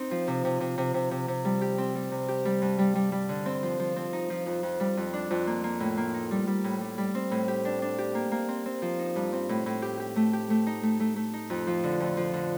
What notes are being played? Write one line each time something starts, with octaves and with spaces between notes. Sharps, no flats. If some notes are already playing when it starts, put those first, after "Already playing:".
Already playing: C4 D#4
F3
C3
C3
C3
C3
C3
C3
C3
G3
G4
C4
G3
C3
G4
G3
G2
G3
G3
G3
D3
C4
F3
F3
C4
D#4
F3
F2
F2
G3
F2
D4
F2
A#3
A#3
A2
A#3
D#4
G3
G3
A2
G3
G3
C4
A2
G4
D4
D4
G4
A#3
A#3
C4
C4
F3
D#4
G2
C4
A2
A2
G4
G4
A3
G4
A3
D#4
A3
A3
A3
D#4
F2
F3
D3
F2
F3
D3